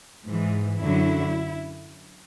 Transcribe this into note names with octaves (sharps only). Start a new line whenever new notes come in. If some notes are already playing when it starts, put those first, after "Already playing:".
G#2 E3
F#2 D3 F#3 E4